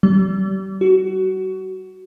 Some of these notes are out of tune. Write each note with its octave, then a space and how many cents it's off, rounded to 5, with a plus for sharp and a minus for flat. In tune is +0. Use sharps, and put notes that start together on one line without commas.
G3 -35
F#4 +20